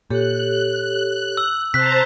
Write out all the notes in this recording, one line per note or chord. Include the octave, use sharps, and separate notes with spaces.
A#2 G4 A4 C#5 F#6
E6
C3 C5 A5 A#5 F#6 B6